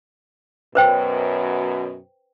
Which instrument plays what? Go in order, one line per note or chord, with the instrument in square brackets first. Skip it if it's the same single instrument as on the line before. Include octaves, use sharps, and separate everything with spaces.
[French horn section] F#2 B2 [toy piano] B4 C5 G5